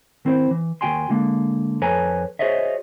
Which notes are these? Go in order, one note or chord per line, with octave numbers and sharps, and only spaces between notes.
D#3 C4 E4 C5
E3
D#2 A3 F#4 G5 G#5 C6
D3 G#3 A#3
F2 A4 B4 C#5 G#5 A#5
F#4 G#4 C5 C#5 D#5 E5